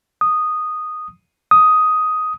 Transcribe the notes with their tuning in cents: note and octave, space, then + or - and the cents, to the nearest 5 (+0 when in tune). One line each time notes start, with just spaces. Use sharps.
D#6 -10
D#6 +5